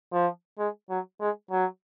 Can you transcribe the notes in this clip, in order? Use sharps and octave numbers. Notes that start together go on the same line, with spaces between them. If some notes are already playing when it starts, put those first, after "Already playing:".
F3
G#3
F#3
G#3
F#3